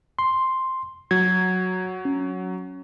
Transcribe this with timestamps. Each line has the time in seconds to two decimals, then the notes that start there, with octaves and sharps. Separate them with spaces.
0.19 C6
1.11 F#3 G#6
2.05 C#4